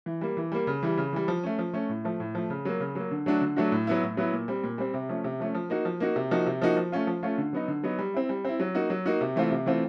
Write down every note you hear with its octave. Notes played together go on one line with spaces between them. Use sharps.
E3
G3 A#3
E3
G3 A#3
C#3
E3 G3
C#3
E3 G3
F3
A3 C#4
F3
A3 C#4
A2
F3 A3
A2
F3 A3
C#3
F#3 A#3
C#3
F#3 A#3
D3
F#3 A3 D4 F#4
D3
F#3 A3 D4 F#4
A2
F#3 B3 E4
A2
F#3 B3 E4
A#2
G3 C4
A#2
G3 C4
C3
F3 A3 C#4
C3
F3 A3 C#4
F3
A#3 D#4 F#4
F3
A#3 D#4 F#4
C3
F3 A#3 D#4 F#4
C3
F3 A#3 D#4 F#4
F3
A3 C#4 F4
F3
A3 C#4 F4
D3
F#3 B3 D#4
D3
F#3 B3 D#4
G3
C4 E4
G3
C4 E4
F#3
A#3 D#4 F#4
F#3
A#3 D#4 F#4
C3
E3 A3 C4 F4
C3
E3 A3 C4 F4